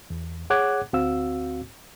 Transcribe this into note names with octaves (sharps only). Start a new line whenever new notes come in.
E2
G#4 C#5 F#5 D6 F#6 G#6
D2 C4 F#4 F5 E6